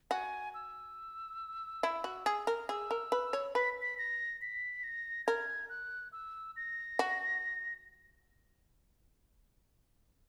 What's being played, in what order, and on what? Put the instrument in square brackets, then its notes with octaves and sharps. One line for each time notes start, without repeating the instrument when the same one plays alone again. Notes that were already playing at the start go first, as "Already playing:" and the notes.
[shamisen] F#4 [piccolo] G#5
[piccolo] E6
[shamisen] E4
F#4
G#4
A#4
[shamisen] G#4 [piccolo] E6
[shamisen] A#4
B4
C#5
[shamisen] B4 [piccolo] B6
[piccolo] B6
A#6
B6
A#6
[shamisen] A#4 [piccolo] G#6
[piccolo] F#6
E6
A#6
[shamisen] F#4